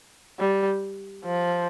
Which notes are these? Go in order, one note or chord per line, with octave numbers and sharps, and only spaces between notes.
G3
F3